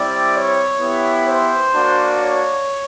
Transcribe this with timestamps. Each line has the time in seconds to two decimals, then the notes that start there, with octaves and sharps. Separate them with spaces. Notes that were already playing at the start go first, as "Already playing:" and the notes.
Already playing: G3 C4 E4 D5
0.34 C#5
0.80 B3 E4 G4
1.26 C5
1.72 A#3 D4 F#4
2.19 C#5